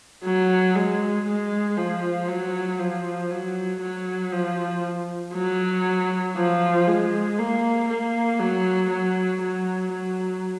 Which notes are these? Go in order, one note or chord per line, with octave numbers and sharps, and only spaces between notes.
F#3
G#3
G#3
F3
F#3
F3
F#3
F#3
F3
F#3
F3
G#3
A#3
A#3
F#3
F#3
F#3
F#3